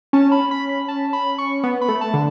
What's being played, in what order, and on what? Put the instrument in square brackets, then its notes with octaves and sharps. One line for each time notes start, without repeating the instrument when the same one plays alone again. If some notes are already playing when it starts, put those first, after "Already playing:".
[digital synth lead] C#4 [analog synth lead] A5
[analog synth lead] B5
B5
B5
A5
B5
C#6
[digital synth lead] B3
[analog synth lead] B5
[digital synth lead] A3
[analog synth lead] A5
[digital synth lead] D3